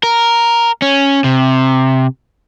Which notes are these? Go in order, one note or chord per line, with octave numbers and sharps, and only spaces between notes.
A#4
C#4
C3